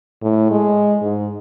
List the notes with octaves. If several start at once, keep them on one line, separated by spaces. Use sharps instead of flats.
A2
G#3
G#2